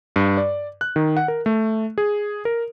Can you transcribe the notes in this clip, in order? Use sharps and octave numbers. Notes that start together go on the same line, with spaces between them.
G2
D5
F#6
D#3
F#5
A#4
A3
G#4
A#4